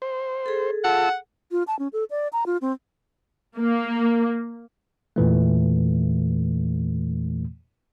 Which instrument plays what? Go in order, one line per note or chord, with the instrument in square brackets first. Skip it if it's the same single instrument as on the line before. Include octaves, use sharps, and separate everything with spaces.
[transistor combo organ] C5
[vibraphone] G#4 A4
[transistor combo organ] F4 A5 E6 [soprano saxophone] F#5
[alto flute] F4
A5
C#4
A4
D5
A#5
F4
C4
[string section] A#3
[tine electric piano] E2 A#2 E3 A3